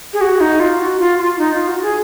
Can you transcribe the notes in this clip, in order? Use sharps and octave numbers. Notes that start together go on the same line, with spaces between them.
G#4
F#4
D#4
F4
F#4
F4
F4
D#4
F4
F#4
G#4